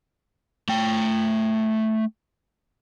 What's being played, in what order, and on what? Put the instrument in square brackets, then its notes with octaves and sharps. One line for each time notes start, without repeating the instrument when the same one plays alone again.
[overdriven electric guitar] A3 G5